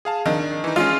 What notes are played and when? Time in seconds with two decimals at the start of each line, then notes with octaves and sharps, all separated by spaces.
0.05 G#4 F5 A5
0.26 D#3 D4
0.64 E3 D#4
0.76 G#3 C#4 F4